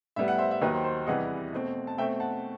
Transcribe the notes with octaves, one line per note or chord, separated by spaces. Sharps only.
A2 G3 B3 E5
F#5
C5 E5
E5
D#2 D#3 F#3 B4 D#5
C5
C5
E2 C3 E3 G3 B3 D#5 F#5
B2 A3 C4
A5
B2 A3 C4 E5 G5
F#5 A5